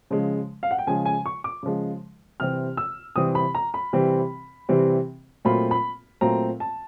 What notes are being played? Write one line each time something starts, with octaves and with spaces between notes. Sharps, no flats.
C#3 F3 G#3
F5
F#5
G5
C#3 F3 G#3 G#5
G#5
C#6
D6
C#3 F3 G#3
C3 E3 G3 C4 F6
E6
C3 E3 G3 C4 D#6
B5
A#5
B5
C3 E3 G3 C4
C3 E3 G3 C4
A#2 F#3 A3 C4 F4 B5
B5
A#2 F#3 A3 C4 F4 A#5
A5